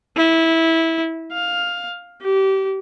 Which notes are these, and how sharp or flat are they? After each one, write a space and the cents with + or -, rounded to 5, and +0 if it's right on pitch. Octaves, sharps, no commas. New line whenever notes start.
E4 -15
F5 +10
G4 -25